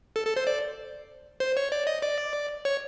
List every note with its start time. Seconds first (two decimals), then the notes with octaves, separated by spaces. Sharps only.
0.16 A4
0.26 A4
0.36 C5
0.47 D5
1.40 C5
1.57 C#5
1.72 D5
1.87 D#5
2.02 D5
2.65 C#5